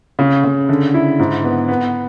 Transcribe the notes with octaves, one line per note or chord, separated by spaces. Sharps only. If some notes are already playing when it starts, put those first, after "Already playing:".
C#3
C#3
D3
E4
G#2
B3
B3